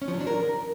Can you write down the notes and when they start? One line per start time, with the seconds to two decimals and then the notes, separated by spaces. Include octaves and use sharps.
0.02 C#4
0.08 F3
0.14 F#3
0.20 D4
0.27 A#4